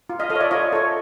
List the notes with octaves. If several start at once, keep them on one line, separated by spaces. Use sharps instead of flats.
F4
D#5 F5
A4 D#5 F5
C#5
D5 E5
F4 C#5 D#5
A4 C#5